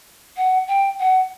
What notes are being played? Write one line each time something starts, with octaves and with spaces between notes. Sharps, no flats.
F#5
G5
F#5